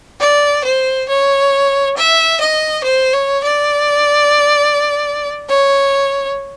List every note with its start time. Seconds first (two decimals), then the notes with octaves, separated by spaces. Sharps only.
0.21 D5
0.64 C5
1.09 C#5
1.97 E5
2.41 D#5
2.84 C5
3.13 C#5
3.44 D5
5.49 C#5